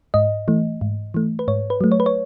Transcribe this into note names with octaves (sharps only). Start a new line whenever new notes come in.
G#2 D#5
E3 A3
G#2
E3 A3
B4
G#2 C#5
B4
F#3 A3
C#5
B4
C#5